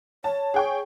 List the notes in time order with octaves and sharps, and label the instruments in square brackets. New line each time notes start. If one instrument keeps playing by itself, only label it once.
[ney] C#5 [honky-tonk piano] A5
[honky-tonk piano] G#4 G5 C#6